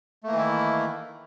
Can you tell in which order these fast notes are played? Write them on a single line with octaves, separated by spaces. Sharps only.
A3 A#3 E3 D#3 E4